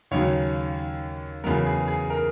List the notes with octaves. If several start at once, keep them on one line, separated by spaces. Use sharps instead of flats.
D#2 C#3 F#3 C#5
E2 C#3 F#3 B3 A#4
G#4
G#4
A#4